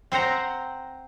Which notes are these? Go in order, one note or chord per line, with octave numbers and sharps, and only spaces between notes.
C4 C5 F#5 A#5